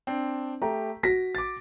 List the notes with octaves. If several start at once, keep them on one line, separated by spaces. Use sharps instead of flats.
C4 D4
A3 G4 A#5
F#4 A#6 B6
D6 A6